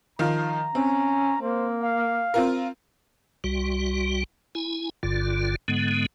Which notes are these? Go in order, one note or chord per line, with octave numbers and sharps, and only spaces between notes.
D#3 F3 F5 A#5
C4 C#4
A#3 C5
F5
C4 F4 A#4
C2 G3 F#4
E4 G#5
G1 G2 D3 F4
G#2 D3 G#3 B3